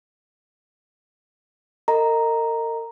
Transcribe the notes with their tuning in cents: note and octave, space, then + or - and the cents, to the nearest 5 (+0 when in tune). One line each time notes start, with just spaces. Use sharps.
A#4 -35 D#5 +5 A#5 +0